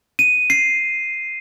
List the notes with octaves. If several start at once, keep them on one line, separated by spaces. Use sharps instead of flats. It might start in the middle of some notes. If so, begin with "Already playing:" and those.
D#7
C7